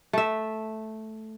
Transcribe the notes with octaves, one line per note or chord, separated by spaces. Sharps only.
A3 E5